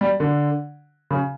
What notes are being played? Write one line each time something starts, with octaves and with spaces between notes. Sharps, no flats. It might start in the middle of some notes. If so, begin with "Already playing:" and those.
G3
D3
C#3